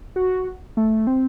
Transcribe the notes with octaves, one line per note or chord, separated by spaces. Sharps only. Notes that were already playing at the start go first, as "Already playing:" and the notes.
F#4
A3
C4